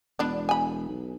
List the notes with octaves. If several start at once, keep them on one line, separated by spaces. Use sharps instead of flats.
E1 B3 D4 D5
G#5 B5
B1